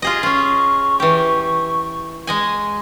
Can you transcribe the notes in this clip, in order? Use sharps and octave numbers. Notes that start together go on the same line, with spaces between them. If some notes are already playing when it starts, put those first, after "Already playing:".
F4 G4 G#4 D#5
C#4 F4 C#6
E3 G4
G#3 D#5 G#5